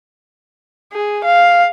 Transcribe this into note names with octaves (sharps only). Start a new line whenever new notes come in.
G#4
F5